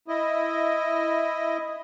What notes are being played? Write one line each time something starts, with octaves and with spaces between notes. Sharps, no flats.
E4 D#5